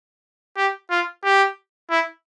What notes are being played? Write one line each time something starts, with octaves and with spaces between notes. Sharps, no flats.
G4
F4
G4
E4